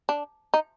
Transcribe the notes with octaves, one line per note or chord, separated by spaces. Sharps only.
D4
D#4